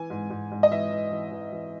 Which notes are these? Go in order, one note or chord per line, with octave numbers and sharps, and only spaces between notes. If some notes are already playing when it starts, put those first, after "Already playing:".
Already playing: E3 G#5
G#2
G#2
G#2
D#5
E3 E5
E3
E3
E3
E3